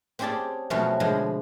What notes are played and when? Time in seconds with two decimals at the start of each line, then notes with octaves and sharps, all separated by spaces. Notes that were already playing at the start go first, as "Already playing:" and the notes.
0.19 C4 C#4 G4 G#4 D5 A5
0.70 B2 F3 F#3 A3 C4 C#4
1.00 B2 D3 F3 G#3